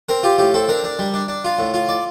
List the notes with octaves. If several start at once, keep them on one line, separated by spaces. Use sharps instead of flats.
C4 A#4
F4 G4
A2 G4
C4 A4
D4 A#4
D4
G3
D4
D4
F4
A2
F4
D5